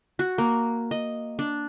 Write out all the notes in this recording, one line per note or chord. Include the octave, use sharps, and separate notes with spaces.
F#4
A#3
D#5
D4